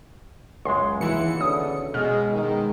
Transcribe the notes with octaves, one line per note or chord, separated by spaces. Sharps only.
C#2 F#2 G#3 C6
D#2 E3 E4 F#4 G#4 C#7
E2 B2 D3 C#4 D#6
B2 G#3 F6
D#3 G#3